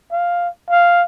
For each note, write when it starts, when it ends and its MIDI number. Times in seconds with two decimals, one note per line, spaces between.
0.12 0.49 77
0.70 1.04 77